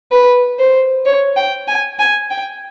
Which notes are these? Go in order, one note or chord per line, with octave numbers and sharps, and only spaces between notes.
B4
C5
C#5
G5
G#5
G#5
G5